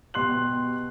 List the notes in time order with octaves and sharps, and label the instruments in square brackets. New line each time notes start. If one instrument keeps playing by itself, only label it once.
[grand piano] B2 G4 C6 F#6 F#7